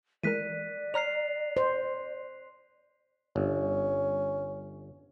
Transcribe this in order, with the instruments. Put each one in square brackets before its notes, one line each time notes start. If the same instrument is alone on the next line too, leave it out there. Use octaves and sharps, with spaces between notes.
[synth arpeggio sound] E3 G#3 A#4 [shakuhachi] D5 [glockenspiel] F#6 B6 D#7
[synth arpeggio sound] C#5 A#5 F6 [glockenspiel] C7 F7
[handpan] C5
[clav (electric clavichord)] G1 [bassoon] C#4